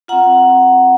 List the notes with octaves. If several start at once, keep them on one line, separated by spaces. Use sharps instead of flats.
C4 F4 F#5 A#5